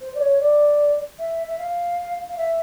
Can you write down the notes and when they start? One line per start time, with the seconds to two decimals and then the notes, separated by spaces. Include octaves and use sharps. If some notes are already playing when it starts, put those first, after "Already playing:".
0.01 C5
0.15 D5
0.20 C#5
0.40 D5
1.19 E5
1.47 E5
1.59 F5
2.29 F5
2.38 E5